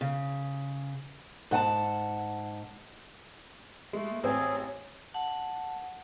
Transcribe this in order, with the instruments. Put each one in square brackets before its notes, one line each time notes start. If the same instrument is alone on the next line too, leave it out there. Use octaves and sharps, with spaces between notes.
[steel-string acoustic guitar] C#3
G#2 F#5 G#5 A5
[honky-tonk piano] G#3 [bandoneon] A3
[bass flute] A#3
[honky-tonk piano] A1 C4 [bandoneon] G#4 [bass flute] C#5
[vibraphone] F#5 A5